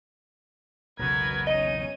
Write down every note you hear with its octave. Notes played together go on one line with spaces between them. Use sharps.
E1 B1 C#3 B3 F#4 A#4 B4 G#6
C#4 D#4 D#5 D#7